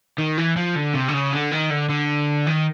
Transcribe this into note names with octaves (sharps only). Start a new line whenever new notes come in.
D#3
E3
F3
D3
C3
D3
C#3
D3
D#3
D3
D3
D#3